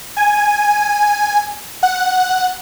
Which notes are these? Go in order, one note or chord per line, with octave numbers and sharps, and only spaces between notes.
G#5
F#5